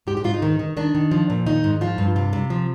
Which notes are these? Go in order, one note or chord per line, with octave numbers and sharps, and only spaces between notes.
G#2 G4
G4
G#2 F4
D#4
D#3
D#3
D#3 D4
D#3
F3
A#2
D#3 D#4
G#2
F3 F4
G2
C3 F4
C3
F3